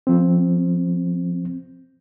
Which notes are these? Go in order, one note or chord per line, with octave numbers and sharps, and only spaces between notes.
F3 C4